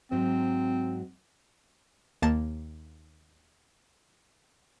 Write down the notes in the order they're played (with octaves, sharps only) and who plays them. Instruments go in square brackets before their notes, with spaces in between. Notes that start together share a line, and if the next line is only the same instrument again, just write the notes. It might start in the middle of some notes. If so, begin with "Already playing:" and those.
[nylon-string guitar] G#2 F#3 C5 [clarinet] C4
[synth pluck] D#2 A#3 A5 A6